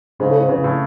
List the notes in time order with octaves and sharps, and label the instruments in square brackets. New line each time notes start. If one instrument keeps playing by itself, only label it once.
[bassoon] G#2 [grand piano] C#3
[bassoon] A2
G#2
[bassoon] E2 [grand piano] C#3
[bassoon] E2
[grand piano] A2